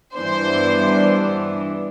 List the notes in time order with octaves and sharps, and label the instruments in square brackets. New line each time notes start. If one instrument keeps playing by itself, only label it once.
[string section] G2 E3 B3 D4 C5